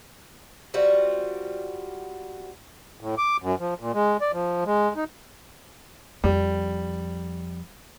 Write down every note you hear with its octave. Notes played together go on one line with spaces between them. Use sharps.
G3 C4 F4 F#4
A2
D6
F#2
F3
A#2
G#3
D5
F3
G#3
D#4
F2 G3